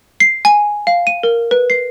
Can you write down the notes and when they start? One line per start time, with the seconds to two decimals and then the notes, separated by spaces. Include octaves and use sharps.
0.20 C7
0.45 G#5
0.87 F5
1.07 D#7
1.23 A#4
1.51 B4
1.70 C7